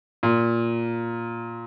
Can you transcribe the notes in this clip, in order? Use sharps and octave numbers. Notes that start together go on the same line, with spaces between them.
A#2